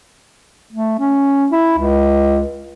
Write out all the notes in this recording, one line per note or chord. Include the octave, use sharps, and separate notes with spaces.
A3
C#4
E4
C#2